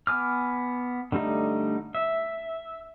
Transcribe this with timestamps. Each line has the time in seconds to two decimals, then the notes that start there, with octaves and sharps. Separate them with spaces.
0.07 B3 G#5 D6 F6
1.12 D3 G3 A3 D#4
1.95 E5